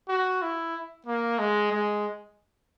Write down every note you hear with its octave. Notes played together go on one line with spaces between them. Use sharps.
F#4
E4
A#3
G#3
G#3